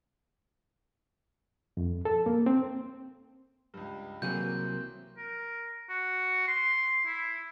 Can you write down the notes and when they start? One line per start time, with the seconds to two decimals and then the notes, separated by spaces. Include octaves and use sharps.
1.77 F2
2.05 A4
2.26 A#3
2.46 C4
3.74 C#2 G2
4.22 C2 E3 F#3 A#3 C4 G#4 G6
5.17 A#4
5.90 F#4
6.48 C6
7.06 E4